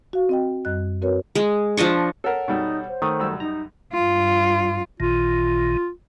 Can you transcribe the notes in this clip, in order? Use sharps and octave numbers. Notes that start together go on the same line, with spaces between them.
F#4 F5
C4 D#5 G5
F#2 G3 D#5 F#6
C4 F#4 A#4 B4 C#5
G#3
F3 D4 D#5 C#6
A4 A#4 C#5 F#5
B2 G3 D#4 A4
C5
D#3 A3 D#6
F#2 G3 E6
D#4 A#5
G2 F4
A1 A#2 D#3 F4